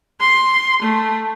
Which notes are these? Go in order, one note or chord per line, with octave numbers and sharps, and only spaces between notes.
C6
A3